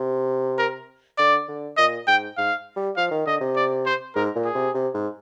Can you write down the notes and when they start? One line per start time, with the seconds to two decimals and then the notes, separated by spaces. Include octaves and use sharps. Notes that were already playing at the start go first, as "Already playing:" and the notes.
Already playing: C3
0.58 A#4
1.18 D3 D5
1.48 D3
1.77 A#2 D#5
2.07 G#2 G5
2.37 G#2 F5
2.76 G3
2.97 F3 F5
3.11 D#3
3.26 D3 D#5
3.41 C3
3.56 D5
3.86 C5
4.15 G#2 A#4
4.36 A#2
4.45 G#4
4.55 C3
4.74 C3
4.94 G#2